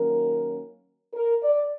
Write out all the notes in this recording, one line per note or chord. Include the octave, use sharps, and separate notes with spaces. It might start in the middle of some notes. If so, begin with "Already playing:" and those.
Already playing: D#3 F#3 A#3 C#4 A#4
A#4
D5